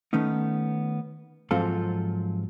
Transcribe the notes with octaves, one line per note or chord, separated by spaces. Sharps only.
D#3 A3 B3 C#4 D#4
G#2 F3 F#3 C4 F4 A4